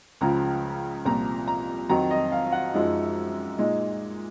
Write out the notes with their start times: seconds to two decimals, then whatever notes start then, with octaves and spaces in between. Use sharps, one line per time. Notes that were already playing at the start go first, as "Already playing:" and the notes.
0.21 C#2 C#3 F3 A#5
1.06 C2 A#2 F3 A#5
1.48 A#5
1.89 F2 D#3 F#3 A#5
2.11 D#5
2.32 F5
2.52 F#5
2.74 F#2 F3 G#3 D#4
3.59 A#2 G#3 D#4